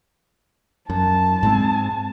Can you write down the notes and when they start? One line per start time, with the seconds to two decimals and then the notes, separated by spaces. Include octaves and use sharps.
0.90 F#2 A5
1.43 G#2 G#3 C4